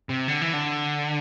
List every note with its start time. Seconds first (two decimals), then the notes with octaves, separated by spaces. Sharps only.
0.09 C3
0.28 D3
0.41 E3
0.53 D3